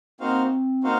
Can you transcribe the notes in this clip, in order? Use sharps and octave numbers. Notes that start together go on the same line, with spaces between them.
A#3 C4 D#4 F#4 C5 F5
A#3 D#4 F#4 C5 F5